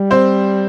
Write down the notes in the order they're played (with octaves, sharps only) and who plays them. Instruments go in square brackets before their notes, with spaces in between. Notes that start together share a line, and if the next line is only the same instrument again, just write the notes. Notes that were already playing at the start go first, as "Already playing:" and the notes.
Already playing: [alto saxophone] G3
[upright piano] C4 C5